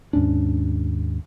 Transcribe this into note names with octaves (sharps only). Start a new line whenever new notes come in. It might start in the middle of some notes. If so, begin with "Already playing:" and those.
D#2 G#2 C#4 D4